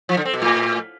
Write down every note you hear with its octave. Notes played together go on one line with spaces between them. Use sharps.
F3
D3
C4
B2
A2